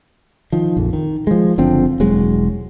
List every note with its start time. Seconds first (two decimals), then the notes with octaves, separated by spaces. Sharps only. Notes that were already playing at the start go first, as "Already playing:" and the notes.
0.52 D#3 F3
0.77 A#1 F2
0.93 D#3
1.27 F3 G#3
1.58 F#1 D3 F3 C4
2.00 E1 F#3 G#3